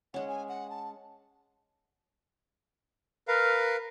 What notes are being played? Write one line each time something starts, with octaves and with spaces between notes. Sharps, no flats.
G#3 C#4 F#5
G#5
F#5
A5
A#4 B4 F5